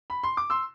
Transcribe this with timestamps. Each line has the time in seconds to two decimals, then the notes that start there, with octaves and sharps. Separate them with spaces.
0.10 B5
0.23 C6
0.37 D6
0.50 C6 E6